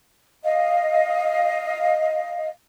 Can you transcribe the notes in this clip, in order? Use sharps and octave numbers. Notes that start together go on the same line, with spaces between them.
D#5 F5